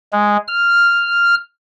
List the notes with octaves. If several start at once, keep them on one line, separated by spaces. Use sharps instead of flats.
G#3
F6